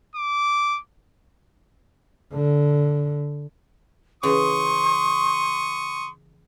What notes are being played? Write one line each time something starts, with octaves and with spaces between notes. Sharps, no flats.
D6
D3
C#3 E3 C6 C#6 D#6